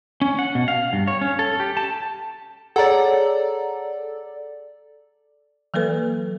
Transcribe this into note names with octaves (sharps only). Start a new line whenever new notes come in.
C#4
F#5
B2
F5
G2
C#5
C#4
A4
G4
A5
G#4 A4 C#5 D5 F#5 A#5
E3 F#3 A#3 A4 B4